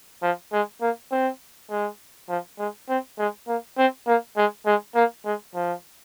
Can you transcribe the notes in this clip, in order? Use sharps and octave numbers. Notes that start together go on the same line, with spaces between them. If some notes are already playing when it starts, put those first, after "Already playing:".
F3
G#3
A#3
C4
G#3
F3
G#3
C4
G#3
A#3
C4
A#3
G#3
G#3
A#3
G#3
F3